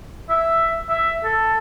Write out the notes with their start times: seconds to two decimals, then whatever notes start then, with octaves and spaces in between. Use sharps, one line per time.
0.29 E5
0.90 E5
1.24 A4